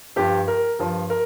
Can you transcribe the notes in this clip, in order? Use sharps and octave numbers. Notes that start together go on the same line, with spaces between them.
G2 F3 G4
A#4
G2 F3
A#4